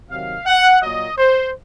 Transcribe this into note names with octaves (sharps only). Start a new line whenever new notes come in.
C3 D#3 F#3 F5
F#5
A#2 F#3 D#5
C5